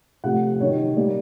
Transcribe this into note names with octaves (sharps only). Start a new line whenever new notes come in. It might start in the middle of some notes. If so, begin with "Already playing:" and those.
C3 F3 A3 F#5
C3 D#3 F#3 C#5
A#2 G3 A#3 D5